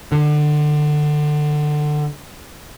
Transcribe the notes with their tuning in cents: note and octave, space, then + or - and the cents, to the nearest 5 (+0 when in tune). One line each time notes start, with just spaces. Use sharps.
D3 +25